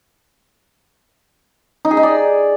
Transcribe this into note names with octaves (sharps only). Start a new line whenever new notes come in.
D#4
G#4
D#4
D5